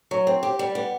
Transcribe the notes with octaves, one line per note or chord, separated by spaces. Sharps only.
F#3
C4
G4
G3
B3